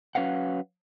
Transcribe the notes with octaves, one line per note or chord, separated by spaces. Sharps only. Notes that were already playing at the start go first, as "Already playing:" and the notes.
F#3 C#4 B4 F5 F#5